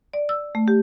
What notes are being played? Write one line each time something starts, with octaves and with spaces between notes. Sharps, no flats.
D5
E6
A3
G4